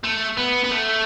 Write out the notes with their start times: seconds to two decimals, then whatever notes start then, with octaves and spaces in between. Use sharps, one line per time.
0.04 A3
0.37 B3
0.64 B3
0.70 A3